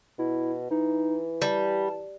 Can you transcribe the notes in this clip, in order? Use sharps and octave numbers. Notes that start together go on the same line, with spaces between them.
B2 E4
E3 D#4
G3 A5